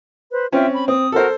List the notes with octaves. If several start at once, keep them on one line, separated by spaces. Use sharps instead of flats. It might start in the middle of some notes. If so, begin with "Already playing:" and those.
B4 C5
C4 C#4 F4 E5 G5
B5
C4 D#6
F#4 A4 A#4 C5